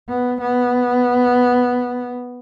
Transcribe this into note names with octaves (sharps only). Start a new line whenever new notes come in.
B3
B3